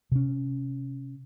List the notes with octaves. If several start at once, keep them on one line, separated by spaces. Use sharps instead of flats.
C3 C#4